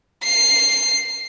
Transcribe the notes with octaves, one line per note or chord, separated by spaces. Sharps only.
C7